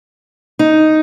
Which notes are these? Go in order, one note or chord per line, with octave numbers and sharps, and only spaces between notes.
D#4